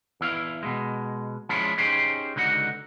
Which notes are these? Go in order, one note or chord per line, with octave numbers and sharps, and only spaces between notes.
E2 E4 F5
B2 G#3
F3 G#3 C#4 D4 E4 F4
C#4 D#4 G4 G#4 C5
C#2 D3 D#4 F#4 F#5